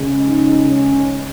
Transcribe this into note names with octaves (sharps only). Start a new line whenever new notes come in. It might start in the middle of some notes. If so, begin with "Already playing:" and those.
Already playing: C#3 G#3
D#4
C#4